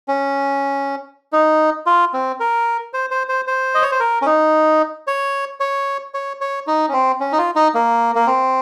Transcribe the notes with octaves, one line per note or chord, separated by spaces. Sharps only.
C#4
D#4
F4
C4
A#4
C5
C5
C5
C5
D#5
C#5
C5
A#4
C#4
D#4
C#5
C#5
C#5
C#5
D#4
C#4
C4
C#4
D#4
F4
D#4
A#3
A#3
C4